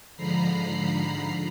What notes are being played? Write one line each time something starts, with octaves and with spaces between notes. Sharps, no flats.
G#2 D3 F3 A#5 B5 C7